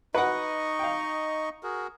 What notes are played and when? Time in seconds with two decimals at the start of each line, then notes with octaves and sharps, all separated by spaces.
0.15 D#4 B4 D#5 F#5 C#6
0.79 F5 G5
1.63 F#4 G#4 A#4